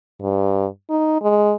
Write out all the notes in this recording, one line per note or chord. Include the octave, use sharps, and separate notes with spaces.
G2
D#4
G#3